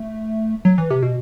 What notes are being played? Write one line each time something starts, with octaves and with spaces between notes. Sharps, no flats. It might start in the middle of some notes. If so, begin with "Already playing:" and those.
Already playing: A3
F#3
E3
C3
B2